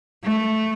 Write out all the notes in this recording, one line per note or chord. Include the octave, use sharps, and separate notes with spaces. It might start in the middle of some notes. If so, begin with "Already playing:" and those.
A3